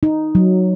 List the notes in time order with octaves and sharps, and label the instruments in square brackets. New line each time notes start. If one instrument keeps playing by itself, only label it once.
[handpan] D#4
F#3